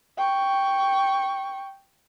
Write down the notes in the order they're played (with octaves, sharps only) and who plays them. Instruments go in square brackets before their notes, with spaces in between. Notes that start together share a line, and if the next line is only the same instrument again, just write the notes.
[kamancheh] G5 C#6